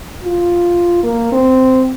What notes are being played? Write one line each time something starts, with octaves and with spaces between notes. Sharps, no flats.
F4
A#3
C4